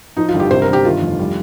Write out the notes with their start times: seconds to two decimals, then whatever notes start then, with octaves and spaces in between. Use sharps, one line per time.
0.17 F3 D#4
0.29 F4
0.34 G1
0.40 G4
0.51 C3 C5
0.62 A#4
0.68 G1
0.73 G4
0.85 D#3 F4
1.02 F1
1.19 G3